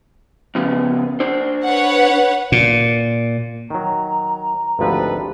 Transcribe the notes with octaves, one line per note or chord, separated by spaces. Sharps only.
F2 C#3 B3
D4 C5
B4 C#5 F#5
A#2
D#3 F#3 A#5
G#1 D2 F3 G4 A4 B4